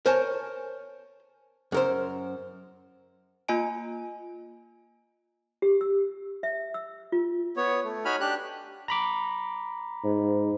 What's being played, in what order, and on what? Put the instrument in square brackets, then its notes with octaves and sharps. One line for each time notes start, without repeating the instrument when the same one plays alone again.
[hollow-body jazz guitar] A#4 C5 C#5 G#5 A5
F#2 A#4 C5
[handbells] A#3 F4 D#5 G#5 D7
[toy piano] G4
E6
E5
E6
F4
[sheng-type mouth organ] B3 C#5
A3
D#4 F#4 C#5 G#5 B5 F6
D4 G4 F#6
[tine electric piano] A#5 B5 D6
[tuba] G#2